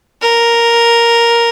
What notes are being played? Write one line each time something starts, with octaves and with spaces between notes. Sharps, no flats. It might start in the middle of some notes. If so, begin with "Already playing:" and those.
A#4